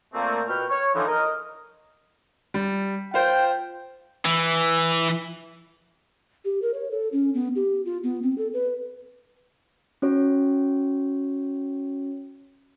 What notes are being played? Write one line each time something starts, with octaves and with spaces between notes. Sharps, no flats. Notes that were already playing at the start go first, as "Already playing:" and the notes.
A#2 A3 A#3 C4
B2 B4 G5 C#6 F6
C#5
D3 E3 F3 D#4
A#4 D#5
G3
F4 C5 G5
E3
G4
A#4
C#5
A4
C#4
B3
G4
F4
B3
C4
A4
B4
C#4 F#4 C#5